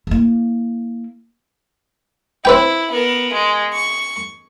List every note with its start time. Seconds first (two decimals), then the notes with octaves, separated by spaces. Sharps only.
0.07 A#3 E4
2.45 C4 E4 B4 G5
2.91 B3 A#4
3.33 G#3
3.73 C#6